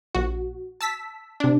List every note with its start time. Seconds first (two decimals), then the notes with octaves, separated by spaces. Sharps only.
0.15 A#1 F#4
0.81 A5 E6 B6
1.40 C3 D4